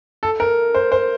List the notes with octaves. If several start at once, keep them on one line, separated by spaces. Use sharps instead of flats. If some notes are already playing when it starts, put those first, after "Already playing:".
A4
A#4
C5
C5